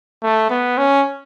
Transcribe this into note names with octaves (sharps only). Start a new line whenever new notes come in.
A3
B3
C#4